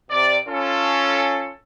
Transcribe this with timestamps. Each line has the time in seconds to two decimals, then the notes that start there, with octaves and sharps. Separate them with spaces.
0.10 C3 D5
0.48 C#4 F4 A4